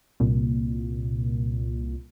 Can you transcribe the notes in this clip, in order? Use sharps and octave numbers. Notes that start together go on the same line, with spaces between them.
C2 A#2